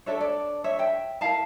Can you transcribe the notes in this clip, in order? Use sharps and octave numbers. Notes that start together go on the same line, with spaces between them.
D4 A4 C#5 E5
D5
C#5 E5
E5 G5
E4 A#4 F5 A5